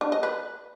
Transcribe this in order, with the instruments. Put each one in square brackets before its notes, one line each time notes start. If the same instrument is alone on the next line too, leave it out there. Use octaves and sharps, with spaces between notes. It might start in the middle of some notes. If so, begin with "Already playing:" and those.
[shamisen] D4
D#5
B4